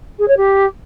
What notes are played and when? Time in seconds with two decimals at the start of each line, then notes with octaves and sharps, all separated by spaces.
0.19 G#4
0.28 C#5
0.37 G4